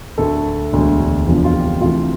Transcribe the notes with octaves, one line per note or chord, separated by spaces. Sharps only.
D2 D3 A3 A4
E1 D2 D3
F1 E2 D3 F3
F4
G4
D2 C3 E3 A3 F4